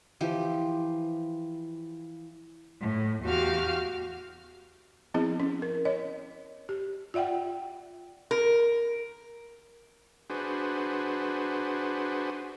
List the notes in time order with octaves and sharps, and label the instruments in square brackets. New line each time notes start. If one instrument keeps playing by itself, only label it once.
[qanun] E3 F3 G4
[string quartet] A2
E2 F#4 G4 F5 F6
[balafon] F3 B3 C4 E4 G#4 D#5
C#4
A#4
C#5 D#5
G4
F4 D5 E5 F#5 G5
[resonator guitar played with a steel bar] A#4
[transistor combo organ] D4 F#4 G#4 B4 C5